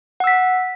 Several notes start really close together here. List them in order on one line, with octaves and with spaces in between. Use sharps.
F#5 E6 B6